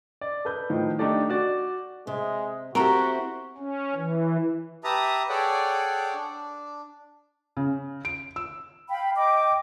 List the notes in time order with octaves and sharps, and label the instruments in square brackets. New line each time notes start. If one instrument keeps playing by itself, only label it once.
[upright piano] D5
A4 B4 G6
A2 D#3 F3
A3 D4 D#4 G4 A4 D5
F#4 D5
[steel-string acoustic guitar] C3 [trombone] G#3
[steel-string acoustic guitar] C4 E4 G4 [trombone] F#4 [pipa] A4 A#4
[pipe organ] C#4
E3
[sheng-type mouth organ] G4 B4 E5 A5 A#5 D#6
G#4 A4 C#5 D5 F#5 G5
D4
[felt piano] C#3
D7
E6
[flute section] F5 G5 B5
D#5 G5 D6